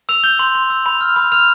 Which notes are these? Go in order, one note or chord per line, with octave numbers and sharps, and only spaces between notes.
E6 F7
G6 G7
C6
C6
E6
B5
F6
B5
F6 F7